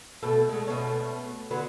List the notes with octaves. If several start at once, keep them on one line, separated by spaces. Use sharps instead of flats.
B2 A3 A4
G#3 A3
B2 A3 C#4
D3 F#3 B3